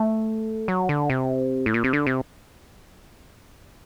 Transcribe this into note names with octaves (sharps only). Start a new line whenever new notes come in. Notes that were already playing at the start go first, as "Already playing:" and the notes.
Already playing: A3
F#3
D3
C3
A2
A#2
C3
D3
C3